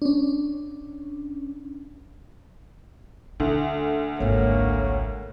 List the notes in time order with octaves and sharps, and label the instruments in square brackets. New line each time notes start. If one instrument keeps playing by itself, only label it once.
[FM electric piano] C#4 D4
[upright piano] D2 [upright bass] C#4
[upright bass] G#1 C#2 [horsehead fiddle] A#3 [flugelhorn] C#5